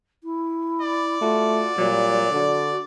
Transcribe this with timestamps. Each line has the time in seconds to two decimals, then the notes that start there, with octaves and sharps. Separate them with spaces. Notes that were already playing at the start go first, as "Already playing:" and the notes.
0.24 E4
0.82 D5
1.22 A3 F4 F#4
1.78 A#2 F#3 G3
2.31 D3 F#4